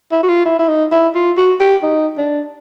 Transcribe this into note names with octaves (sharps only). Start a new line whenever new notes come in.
E4
F#4
F4
E4
E4
D#4
E4
F4
F#4
G4
D#4
D4